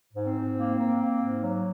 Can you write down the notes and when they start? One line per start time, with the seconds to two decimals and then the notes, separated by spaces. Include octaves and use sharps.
0.13 G#2
0.24 C4
0.35 G#2
0.57 A#3
0.78 A#3
0.99 A#3
1.21 G#2
1.41 F#3